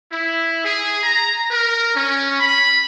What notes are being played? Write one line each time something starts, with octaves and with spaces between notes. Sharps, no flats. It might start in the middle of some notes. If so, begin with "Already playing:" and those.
E4
G#4
A#5
A#4
C#4
B5